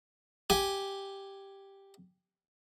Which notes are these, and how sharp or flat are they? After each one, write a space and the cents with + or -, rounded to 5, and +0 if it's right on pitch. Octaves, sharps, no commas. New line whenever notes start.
G4 +0 G#5 +0